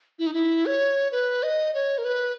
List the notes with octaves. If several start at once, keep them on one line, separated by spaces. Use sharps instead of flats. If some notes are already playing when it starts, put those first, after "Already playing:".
E4
D#4
E4
C#5
B4
D#5
C#5
A#4
B4